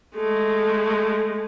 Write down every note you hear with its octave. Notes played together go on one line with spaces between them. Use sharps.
G#3 A3